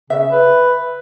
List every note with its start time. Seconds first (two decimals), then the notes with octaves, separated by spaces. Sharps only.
0.10 C#3 E5
0.31 B4